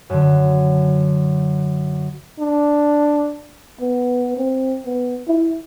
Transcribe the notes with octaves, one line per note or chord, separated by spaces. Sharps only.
F#2 D3
D4
B3
C4
B3
E4